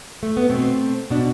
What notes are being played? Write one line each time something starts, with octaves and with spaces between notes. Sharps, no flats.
A3
B3
B2 A3 C4
B2 D4